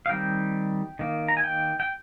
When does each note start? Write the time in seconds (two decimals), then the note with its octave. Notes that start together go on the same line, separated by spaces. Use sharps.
0.06 F5
0.09 D#3 G3 C4 G5
0.99 D#3 A#3
1.28 A#5
1.37 G#5
1.44 G5
1.80 G5